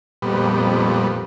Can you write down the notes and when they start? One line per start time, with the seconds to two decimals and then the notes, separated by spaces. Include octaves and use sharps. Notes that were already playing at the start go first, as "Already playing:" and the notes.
0.22 G#1 F2 A#2 G3 B3